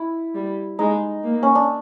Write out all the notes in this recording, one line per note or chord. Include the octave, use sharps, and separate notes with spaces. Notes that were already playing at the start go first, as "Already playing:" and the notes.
Already playing: E4
G3
G#3 D#4
A#3
C#4
D4